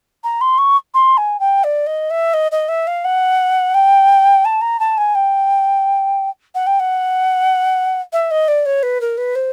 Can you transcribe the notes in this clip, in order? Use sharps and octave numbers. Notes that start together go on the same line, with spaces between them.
A#5
C6
C#6
C6
G#5
G5
D5
D#5
E5
D#5
D#5
E5
F5
F#5
G5
A5
A#5
A5
G#5
G5
F#5
G5
F#5
E5
D#5
D5
C#5
B4
A#4
B4
C5